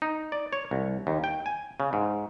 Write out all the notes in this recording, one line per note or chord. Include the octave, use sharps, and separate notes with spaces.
D#4
D5
C#5
C2
D#2
G5
G#5
C#3
G#2